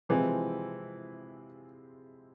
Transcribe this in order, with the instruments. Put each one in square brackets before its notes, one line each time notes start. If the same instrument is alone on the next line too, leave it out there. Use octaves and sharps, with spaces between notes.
[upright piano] C3 F3 G#3 C4 E4 [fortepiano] E3